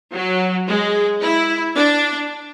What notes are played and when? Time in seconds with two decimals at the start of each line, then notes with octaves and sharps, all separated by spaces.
0.14 F#3
0.68 G#3
1.22 E4
1.77 D4